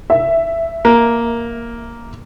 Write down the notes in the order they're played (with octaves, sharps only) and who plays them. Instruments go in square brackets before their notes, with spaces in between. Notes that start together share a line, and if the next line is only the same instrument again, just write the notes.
[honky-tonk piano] E5
[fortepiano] A#3